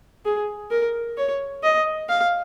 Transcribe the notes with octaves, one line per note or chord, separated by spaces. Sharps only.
G#4
A#4
C#5
D#5
F5